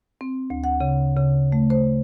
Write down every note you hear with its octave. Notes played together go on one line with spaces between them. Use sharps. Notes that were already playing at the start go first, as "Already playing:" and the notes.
C4
D2
F#5
C#3
C#3
A3
C5